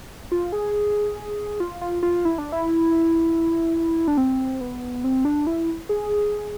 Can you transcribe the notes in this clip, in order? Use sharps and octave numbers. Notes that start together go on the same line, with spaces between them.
F4
G#4
F4
F4
F4
E4
D4
E4
D4
C4
B3
C4
D4
E4
G#4